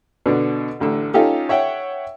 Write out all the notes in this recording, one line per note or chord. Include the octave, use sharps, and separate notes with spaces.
B2 D3 D4
A1 D3 E6
C#4 D#4 F4 G4 A4
C#5 E5 F#5 G5